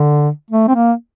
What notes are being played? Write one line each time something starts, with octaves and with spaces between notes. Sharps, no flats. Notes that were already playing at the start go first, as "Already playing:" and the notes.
Already playing: D3
A3
C4
A#3